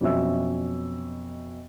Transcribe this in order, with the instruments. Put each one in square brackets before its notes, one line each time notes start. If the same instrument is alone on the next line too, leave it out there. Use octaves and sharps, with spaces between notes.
[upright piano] F2 B2 F#3 C#4 E5 E6